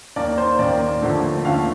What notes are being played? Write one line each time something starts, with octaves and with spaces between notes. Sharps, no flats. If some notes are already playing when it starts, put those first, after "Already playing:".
D#2 D#3 A#3 D5
C5
D#2 D#3 A#3 D5
D#2 D3 F3 A3
D#2 D3 F3 A3 F5